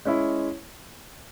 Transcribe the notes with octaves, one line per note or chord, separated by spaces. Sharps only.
G#3 C#4 E4